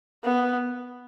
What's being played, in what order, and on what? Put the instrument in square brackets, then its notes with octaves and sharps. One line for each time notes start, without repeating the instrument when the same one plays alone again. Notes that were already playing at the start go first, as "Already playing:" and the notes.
[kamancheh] B3